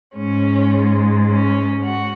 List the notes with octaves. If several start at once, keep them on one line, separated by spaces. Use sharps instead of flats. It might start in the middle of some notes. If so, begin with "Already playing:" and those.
G#2 G#3 C#4
C#4
F#4